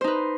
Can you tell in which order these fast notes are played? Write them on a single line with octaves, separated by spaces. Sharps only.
C5 D#4 B4